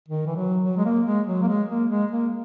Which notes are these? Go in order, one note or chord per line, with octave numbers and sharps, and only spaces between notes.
D#3
E3
F#3
F#3
G#3
A#3
G#3
F#3
A#3
G#3
A#3
G#3
A#3